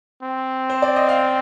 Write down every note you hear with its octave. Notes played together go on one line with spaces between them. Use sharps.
C4
C5
D5
D#5
F5